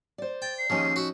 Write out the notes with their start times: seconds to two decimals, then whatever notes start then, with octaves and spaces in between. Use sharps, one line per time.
0.18 C5 D5
0.42 G5 A6
0.58 C7
0.70 D#2 C#3 F3 C#4 D#4
0.96 F#4 E5